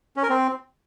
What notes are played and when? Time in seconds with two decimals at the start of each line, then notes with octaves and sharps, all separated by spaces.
0.16 C#4
0.23 A#4
0.30 C4